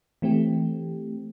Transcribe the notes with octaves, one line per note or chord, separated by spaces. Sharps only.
E3 A3 C4 G4